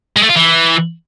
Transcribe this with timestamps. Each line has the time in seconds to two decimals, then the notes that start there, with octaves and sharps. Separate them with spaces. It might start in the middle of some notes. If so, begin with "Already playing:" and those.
0.16 G#3
0.23 A3
0.29 F4
0.36 E3